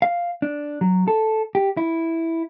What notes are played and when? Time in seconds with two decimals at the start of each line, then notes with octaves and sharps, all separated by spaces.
0.02 F5
0.42 D4
0.81 F#3
1.08 A4
1.55 G4
1.77 E4